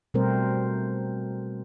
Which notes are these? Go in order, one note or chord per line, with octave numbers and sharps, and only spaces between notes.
B2 G3 A3 C4 A#4 C5